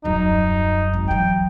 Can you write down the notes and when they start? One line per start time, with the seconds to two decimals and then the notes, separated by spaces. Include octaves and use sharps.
0.04 D#1 F#2 D#4
0.93 G#1
1.08 E3 F#3 G5